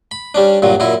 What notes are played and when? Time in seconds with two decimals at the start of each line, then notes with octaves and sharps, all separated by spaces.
0.11 B5
0.34 G3 C#4 D4
0.62 G2 A#2 F#3
0.80 F#2 A#2 E4